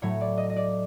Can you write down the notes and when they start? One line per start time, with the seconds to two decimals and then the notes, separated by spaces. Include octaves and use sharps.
0.02 A2 F#3 A3 C#5
0.21 D5
0.37 D#5
0.49 D#5
0.56 D5